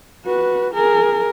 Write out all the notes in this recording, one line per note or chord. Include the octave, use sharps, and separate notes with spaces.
F#4 B4
G#4 A#4